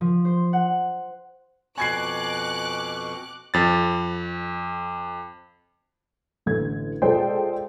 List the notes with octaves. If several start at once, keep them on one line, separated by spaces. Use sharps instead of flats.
F3
C5
F#5
F2 B2 G#5 C#6 D6 F#6 G#6 C7
F2 A6
A1 D3 G#6
G#3 F4 A4 C5 D5 G5